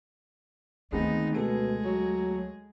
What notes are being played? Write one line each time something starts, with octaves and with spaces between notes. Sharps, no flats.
D2 D#3 G#3 A3 B3 C4 D#4
B2 G#3 G#4 A4
F#3